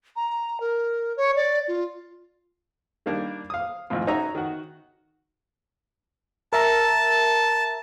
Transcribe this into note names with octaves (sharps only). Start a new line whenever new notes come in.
A#5
A#4
C#5
D5
F4
D#3 G3 A#3 D4
F5 D#6
G#1 F2 A2 F4
C#4 D#4 F#4 C#5 E5 A#5
D#3 F#4
A#4 E5 A5 A#5